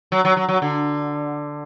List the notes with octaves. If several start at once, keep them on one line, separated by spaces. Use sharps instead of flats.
F#3
F#3
F#3
F#3
D3